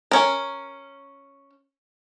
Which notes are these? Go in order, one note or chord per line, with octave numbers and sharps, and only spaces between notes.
C#4 A#4